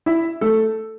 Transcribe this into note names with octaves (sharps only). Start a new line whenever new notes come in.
E4 E5
A3 A4